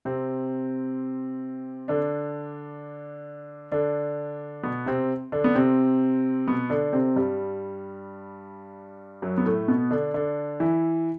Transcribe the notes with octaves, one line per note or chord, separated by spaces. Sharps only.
C3 C4
D3 D4
D3 D4
B2 B3
C3 C4
D3 D4
B3
C3 C4
B2 B3
D3 D4
C3 C4
G2 G3
F#2 F#3
B3
A2 A3
B2 B3
D3 D4
D3 D4
E3 E4